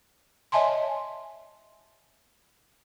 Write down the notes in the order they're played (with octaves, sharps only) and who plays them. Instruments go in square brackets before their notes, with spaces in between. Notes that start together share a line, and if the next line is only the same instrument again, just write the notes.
[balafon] C#5 D#5 E5 G#5 A5 C6